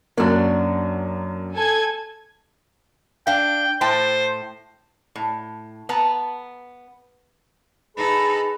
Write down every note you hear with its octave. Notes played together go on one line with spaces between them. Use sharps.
F#2 F#3 A#3 D4
A4 G#5 G#6
D4 F5 G5
A2 C5 G5 A5
A2
B3 B4 A5 A#5
D#4 G#4 A4 B4 B5